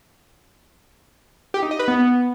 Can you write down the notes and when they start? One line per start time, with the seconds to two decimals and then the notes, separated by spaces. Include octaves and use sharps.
1.54 G4
1.63 D#4
1.71 D#5
1.79 B4
1.88 B3